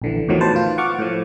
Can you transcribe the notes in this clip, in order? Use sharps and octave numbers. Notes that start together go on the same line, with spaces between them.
A#1 D3 E3
E2 A2 D#3 F3 F#3
B4 C5 A5
F4
F#5 C#6 D6 F6
A2 F3